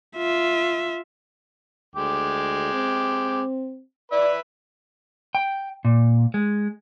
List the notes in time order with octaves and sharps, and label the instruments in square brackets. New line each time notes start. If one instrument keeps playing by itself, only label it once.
[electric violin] F4 E5
[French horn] D2 [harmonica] G#3 G5 D6
[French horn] C4
[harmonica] B4 E5 [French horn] D5
[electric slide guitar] G5
A#2
G#3